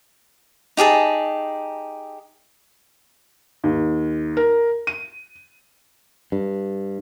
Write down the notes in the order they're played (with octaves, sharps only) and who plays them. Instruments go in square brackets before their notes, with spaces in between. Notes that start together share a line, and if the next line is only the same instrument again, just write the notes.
[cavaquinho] D#4 G4 G#4 A5
[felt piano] D#2
A#4
D#7
[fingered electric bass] G2